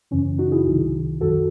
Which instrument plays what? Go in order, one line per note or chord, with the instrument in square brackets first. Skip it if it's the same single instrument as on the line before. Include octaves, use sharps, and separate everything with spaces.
[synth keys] F#2 C#3 E3 C#4
D#4 F#4
E4 G#4
C2 C3 D#3 F#3
F#2 D#3 F#3 F#4 A4